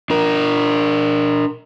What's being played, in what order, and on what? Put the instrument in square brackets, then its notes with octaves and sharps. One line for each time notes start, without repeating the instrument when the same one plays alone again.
[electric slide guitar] D4 A#4